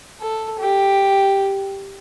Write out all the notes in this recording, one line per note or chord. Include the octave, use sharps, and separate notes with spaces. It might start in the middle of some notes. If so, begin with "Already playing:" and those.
A4
G4